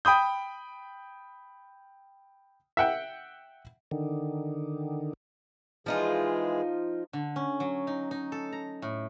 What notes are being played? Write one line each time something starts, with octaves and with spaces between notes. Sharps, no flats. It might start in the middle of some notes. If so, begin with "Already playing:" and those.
G5 B5 D#6 G6
E5 F#5 G5
D3 D#3
E3 F3 G#3 D#4 F4 G#4
D3
C#4
F#3
D#4
D#4
A4
A#5
A2